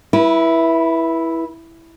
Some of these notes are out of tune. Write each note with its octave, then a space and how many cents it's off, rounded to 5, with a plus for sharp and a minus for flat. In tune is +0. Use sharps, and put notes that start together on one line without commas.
E4 +0 B4 -30